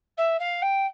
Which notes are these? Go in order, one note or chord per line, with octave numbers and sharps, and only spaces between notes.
E5
F5
G5